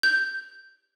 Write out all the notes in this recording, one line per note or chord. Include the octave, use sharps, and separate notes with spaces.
G6